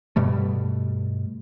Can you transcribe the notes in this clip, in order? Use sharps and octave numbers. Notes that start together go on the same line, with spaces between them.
G2 B2 G3 A3